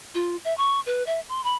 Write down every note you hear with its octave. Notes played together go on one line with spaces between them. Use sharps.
F4
E5
C#6
B4
E5
C6
B5